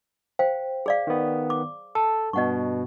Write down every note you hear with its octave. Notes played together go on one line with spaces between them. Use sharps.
C5 F5 G5
G#4 D5 F5
D#3 B3
D6
A4 A5
G2 B2 D#5 F#5 C#6